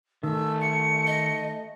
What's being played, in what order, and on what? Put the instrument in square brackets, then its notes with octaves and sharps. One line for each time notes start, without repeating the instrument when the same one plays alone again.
[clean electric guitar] D#3 [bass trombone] A3 [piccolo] E6
[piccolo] C#7
[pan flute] D#5